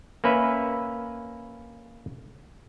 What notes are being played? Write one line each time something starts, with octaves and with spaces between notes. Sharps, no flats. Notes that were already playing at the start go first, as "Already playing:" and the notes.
A#3 C#4 B4 E5